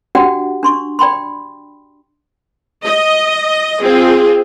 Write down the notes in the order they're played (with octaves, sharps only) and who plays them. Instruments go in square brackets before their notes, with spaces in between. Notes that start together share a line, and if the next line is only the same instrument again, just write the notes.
[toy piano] D4 F#4 G4 D5 F#5 G5
D4 C6 C#6
D5 G5 B5 C6
[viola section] D#5
C4 F4 G#4